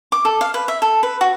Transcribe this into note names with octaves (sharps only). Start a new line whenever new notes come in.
D6
A4
F5
B4
E5
A4
B4
F#4